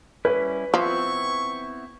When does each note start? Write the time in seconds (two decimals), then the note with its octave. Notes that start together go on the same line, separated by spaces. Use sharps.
0.25 G3 C#4 E4 B4
0.74 F3 B3 C4 E4 C#6